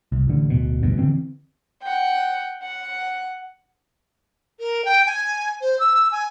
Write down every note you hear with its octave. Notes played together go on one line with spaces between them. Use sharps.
C2
A1 D3
D1 B2
D1 B1 G2 B2
D3 E3 C4
F#5 G5
F#5
A#4
G5
G#5
C5
E6
G#5